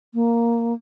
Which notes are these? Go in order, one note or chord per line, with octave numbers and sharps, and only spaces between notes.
A#3